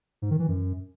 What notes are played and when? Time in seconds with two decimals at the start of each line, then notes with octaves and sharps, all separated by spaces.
0.22 G#2
0.31 D#3
0.39 E3
0.48 F#2